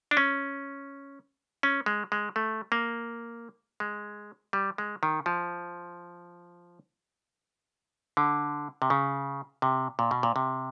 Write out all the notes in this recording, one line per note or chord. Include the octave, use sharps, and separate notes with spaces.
D4
C#4
C#4
G#3
G#3
A3
A#3
G#3
G3
G#3
D#3
F3
D3
C3
C#3
C3
A#2
B2
A#2
C3